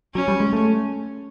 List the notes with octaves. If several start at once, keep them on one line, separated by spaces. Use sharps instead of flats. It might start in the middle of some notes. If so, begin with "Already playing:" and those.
F#3 C#4
G3
G#3
A3